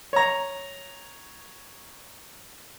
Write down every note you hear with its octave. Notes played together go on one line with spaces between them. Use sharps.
C#5 A#5